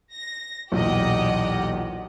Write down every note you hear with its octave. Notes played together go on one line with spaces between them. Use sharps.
A#6
B1 E2 A#2 G4 D#5 F#5